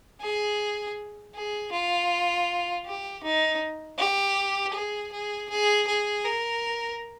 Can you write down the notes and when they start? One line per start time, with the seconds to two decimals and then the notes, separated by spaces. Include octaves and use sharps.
0.21 G#4
1.35 G#4
1.72 F4
2.86 G4
3.23 D#4
3.98 G4
4.74 G#4
5.12 G#4
5.49 G#4
5.87 G#4
6.24 A#4